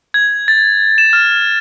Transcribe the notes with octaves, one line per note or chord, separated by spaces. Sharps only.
G#6
A6
E7
F6